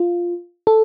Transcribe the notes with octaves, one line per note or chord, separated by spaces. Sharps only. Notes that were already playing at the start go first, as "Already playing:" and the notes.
Already playing: F4
A4